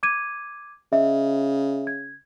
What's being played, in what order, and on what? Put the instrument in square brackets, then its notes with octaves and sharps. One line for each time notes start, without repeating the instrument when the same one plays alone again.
[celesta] D6 G#6 D#7
[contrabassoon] C#3 [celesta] D#5 E5
[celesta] G#6